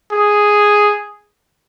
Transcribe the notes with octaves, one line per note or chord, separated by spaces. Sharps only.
G#4